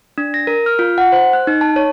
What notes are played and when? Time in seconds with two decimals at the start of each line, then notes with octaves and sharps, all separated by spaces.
0.18 D4
0.34 A#6
0.47 A#4
0.66 F6
0.79 F4
0.98 F#5
1.12 C5
1.33 F#6
1.47 D#4
1.61 A5
1.76 C#5